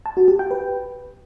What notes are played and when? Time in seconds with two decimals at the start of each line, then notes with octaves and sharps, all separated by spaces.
0.06 A5
0.17 F#4
0.28 G4
0.39 G5
0.51 B4